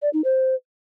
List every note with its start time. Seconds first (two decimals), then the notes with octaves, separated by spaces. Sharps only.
0.02 D5
0.13 D#4
0.24 C5